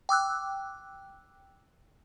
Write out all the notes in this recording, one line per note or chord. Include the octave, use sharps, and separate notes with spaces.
G5 D6 E6 F#6